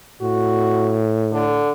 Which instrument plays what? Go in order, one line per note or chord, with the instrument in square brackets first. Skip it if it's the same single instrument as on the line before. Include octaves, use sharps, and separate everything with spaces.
[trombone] A2 [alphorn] F#4
[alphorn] D3